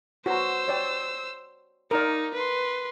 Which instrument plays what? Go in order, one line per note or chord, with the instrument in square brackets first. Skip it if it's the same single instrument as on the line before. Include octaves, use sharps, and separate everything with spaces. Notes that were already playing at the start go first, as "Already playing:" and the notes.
[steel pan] F#4 B4 A#5 [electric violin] C5 E6
[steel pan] C#5 D5 G5
[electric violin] D#4 [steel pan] A#4 D5
[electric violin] B4 C6